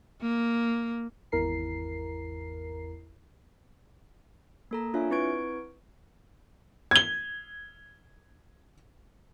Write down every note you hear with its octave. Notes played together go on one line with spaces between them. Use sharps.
A#3
G#1 E2 E4 A#4 A#5 C7
A#3 A4 A#5
D4 F4 C#5 E5 F5 G#5
C4 E4 B4 C#6 G#6 D7
G#6 G7